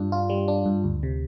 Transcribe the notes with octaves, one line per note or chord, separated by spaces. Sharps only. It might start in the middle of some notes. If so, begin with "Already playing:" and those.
Already playing: G2 G3 D4 F4
F4
G3
D4
G2
D2
C3